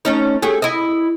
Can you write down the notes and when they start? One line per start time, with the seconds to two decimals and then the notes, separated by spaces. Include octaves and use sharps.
0.05 A3 C#4 D#4
0.42 A3 G4 G#4
0.62 E4 D#5